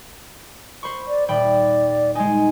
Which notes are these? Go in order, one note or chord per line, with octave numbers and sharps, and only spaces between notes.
C5 B5 C#6
D5
D#1 D5 G5 B5
G#3 D#4 G#5